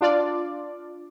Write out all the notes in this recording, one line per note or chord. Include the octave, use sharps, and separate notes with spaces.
D4 F4 D5